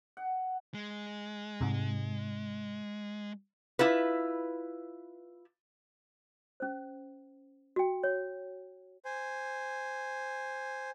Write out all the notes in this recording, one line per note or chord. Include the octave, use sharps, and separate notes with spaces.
F#5
G#3
G#2 C3
E4 F4 B4
C#4 C5
F#4 G5
C#5
C5 G#5